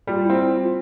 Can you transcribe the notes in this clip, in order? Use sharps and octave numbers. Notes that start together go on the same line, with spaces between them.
G3 F4
C4 E4
E4
F4